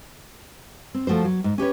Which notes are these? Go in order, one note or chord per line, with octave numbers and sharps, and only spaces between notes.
C4
F3 A3 F#4 C5
F#3
G#2
C#4 G4 B4 C#5